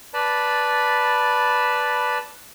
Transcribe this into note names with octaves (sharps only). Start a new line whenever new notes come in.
B4 D5 A5 B5